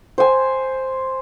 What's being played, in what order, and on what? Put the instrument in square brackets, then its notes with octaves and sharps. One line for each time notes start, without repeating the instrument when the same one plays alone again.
[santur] C5 G#5